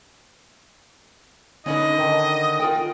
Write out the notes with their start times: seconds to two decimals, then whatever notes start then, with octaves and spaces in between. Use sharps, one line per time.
1.66 D3 C#4 D#4 B4 D#5
1.98 D#3
2.60 F4 A#4 G5